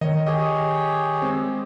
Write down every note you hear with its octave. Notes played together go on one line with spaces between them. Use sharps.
D#3 C#5 D#5
G4 G#4 C#5 D#5
G#3 C4